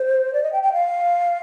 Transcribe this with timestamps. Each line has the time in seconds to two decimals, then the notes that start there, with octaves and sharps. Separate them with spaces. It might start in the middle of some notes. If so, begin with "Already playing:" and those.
Already playing: C5
0.33 D5
0.43 D#5
0.53 G5
0.63 G5
0.73 F5